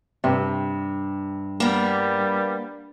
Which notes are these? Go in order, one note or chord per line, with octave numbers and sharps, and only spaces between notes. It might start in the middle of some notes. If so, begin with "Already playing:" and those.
G2 C3
G3 A#3 B3